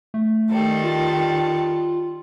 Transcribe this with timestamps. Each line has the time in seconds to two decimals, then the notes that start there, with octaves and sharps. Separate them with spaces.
0.14 A3
0.50 D#3 G3 A4
0.84 F4